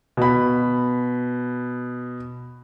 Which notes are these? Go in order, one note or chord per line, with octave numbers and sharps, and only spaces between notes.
B2 B5